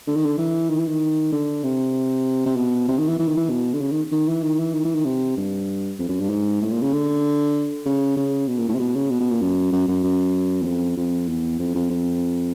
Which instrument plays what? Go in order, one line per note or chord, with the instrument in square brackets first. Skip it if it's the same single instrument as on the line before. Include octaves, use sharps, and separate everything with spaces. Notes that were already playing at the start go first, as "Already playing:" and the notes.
[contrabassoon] D3
D#3
D3
E3
D#3
E3
D#3
D3
C3
C3
B2
C3
D#3
E3
E3
D#3
E3
B2
D3
C#3
D#3
D#3
E3
D#3
E3
D#3
E3
D#3
C3
G2
F2
F#2
G2
G#2
A2
A#2
C#3
D3
C#3
C#3
B2
A#2
A2
C3
B2
C#3
B2
B2
A#2
F#2
F#2
F#2
F#2
E2
F2
F2
E2
F2
F2
F2